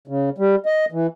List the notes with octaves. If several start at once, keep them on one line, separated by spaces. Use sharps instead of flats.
C#3
G3
D#5
E3